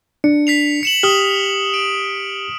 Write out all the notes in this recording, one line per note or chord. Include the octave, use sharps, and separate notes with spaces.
D4 C#7
B6 C7 F7
C#7 E7 F#7
G4 D#6 F6
D7